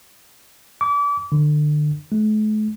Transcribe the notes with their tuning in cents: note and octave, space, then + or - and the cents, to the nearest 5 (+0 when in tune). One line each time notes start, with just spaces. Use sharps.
D6 -30
D3 +30
A3 -45